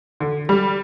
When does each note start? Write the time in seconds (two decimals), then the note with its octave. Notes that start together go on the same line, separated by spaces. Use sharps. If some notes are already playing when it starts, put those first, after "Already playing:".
0.20 D3
0.49 G3